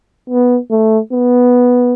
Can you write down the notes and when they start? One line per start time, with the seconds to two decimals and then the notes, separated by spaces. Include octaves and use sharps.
0.30 B3
0.71 A3
1.12 B3